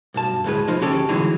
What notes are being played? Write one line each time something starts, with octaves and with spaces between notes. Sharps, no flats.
B1 G2 A5
D2 A2 G#3 B4
C2 F3 D#4
D2 C#3 C#4 G4 A4
C2 D3 E3 F#3 G#3 D#4